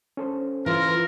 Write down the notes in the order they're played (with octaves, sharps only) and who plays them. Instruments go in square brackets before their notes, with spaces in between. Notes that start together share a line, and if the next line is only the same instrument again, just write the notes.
[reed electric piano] C#4 A4 C5
[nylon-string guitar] E3 [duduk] F4 [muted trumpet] A#4